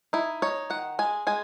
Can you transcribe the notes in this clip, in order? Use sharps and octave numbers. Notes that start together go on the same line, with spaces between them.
D#4 E4
D#4 C#5
D#3 F#5
G#3 G#5
G#3 G#5